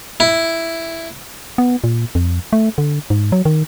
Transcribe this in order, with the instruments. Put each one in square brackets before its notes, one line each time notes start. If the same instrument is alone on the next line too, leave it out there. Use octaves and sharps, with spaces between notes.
[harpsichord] E4
[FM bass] B3
A#2
F2
A3
D3
G#2
F#3
D#3